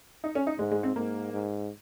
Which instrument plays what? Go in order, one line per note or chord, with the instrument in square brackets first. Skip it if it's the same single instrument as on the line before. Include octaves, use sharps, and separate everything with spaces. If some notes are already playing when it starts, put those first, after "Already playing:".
[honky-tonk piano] D#4
C#4
D#4
[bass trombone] G#2 [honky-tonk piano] G#3
[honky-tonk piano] G#3
C4
[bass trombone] G#2 [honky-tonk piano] A#3
[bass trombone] G#2